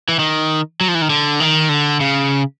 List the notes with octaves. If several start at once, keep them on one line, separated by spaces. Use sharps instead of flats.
E3
D#3
F#3
F3
E3
D#3
D3
D#3
D3
C#3